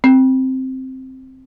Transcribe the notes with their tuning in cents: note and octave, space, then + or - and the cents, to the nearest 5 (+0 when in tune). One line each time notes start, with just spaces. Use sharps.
C4 +0